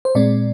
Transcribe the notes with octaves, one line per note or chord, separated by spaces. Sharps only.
C5
A#2 G#3 C4 D5